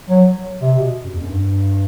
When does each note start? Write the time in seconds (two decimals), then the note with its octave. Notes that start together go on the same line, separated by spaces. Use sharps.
0.10 F#3
0.62 C3
0.79 B2
1.04 F#2
1.13 E2
1.21 F#2
1.30 G2